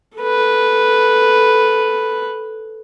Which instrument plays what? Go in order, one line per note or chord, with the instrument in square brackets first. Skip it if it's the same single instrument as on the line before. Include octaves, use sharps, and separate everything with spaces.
[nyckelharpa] A4 B4